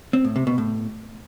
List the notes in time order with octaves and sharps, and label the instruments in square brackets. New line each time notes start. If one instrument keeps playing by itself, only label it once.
[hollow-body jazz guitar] C4
A2
C3
B2
A2